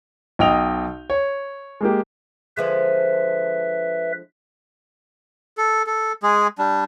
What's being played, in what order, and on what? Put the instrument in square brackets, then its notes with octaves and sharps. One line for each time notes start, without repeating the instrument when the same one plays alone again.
[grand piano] B1 D#5 G5 D#6 F7
C#5
G#3 A#3 G4
[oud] D3 F3 G#3 [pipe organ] B4 E5
[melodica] A4
A4
G#3 G#4
G3 D4